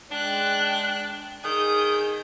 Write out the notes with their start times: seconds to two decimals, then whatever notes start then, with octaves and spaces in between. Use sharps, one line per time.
0.11 G#3 D4 G5 F#6
1.45 D#3 G#4 D#6 G6